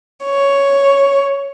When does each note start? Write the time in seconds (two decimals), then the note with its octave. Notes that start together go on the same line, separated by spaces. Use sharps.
0.24 C#5